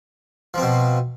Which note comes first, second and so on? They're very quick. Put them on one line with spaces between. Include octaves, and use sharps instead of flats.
F3 C4 B2